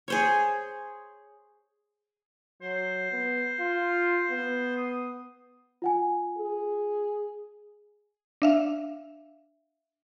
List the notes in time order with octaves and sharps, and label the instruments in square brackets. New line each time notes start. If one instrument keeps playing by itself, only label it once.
[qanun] G#4 C5 C#5
[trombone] F#3 [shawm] C5
[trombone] B3
F4
B3
[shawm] D#6
[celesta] F4 F#5 G#5
[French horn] G#4
[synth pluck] D4 E5 F5